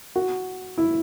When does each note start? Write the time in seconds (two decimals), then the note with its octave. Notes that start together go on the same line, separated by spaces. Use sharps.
0.16 F#4
0.78 E4